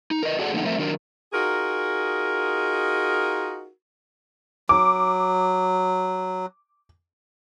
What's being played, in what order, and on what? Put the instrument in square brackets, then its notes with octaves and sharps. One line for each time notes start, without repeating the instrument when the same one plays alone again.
[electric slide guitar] D#4
A#4 B4 D#5
F#4 G#4 A4 D5 F5 F#5
D3 F3 A3 A#3 D#4 F#5
F3 A3 C4 A#4 C5 E5
D#3 F#3 D4 A#4
[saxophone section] D#4 F4 F#4 G#4 A#4
[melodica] F#3 [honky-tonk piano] D6